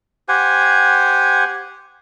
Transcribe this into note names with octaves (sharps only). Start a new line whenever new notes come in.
G4 C5 F#5 G#5